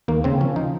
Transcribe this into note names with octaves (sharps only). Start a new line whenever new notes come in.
D#2 A#3
C#3 C4
F3 C#4
F3 D#4